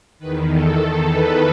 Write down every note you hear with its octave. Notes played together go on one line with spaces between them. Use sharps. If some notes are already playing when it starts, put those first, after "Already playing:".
E2 D#3 B4
A4
A4
B4